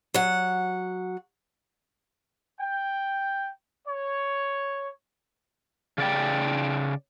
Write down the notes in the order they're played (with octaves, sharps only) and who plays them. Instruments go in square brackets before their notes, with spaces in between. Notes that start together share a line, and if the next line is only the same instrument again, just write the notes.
[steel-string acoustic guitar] F#3 F#5
[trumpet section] G5
C#5
[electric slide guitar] C#3 D5 G5